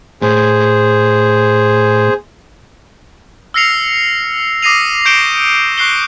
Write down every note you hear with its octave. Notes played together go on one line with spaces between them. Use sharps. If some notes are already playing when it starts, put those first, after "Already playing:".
A2 G#4 C5
E6 F6 A#6 C7 C#7 F7
D6 D#6 A#6 C7 D#7 F7
C#6 G6 C#7 D7 E7 G7
C#6 F#6 C7 G7